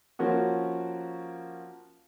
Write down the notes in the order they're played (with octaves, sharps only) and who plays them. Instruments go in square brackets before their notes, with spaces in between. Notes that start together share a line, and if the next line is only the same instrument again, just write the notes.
[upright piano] F3 A#3 C#4 F#4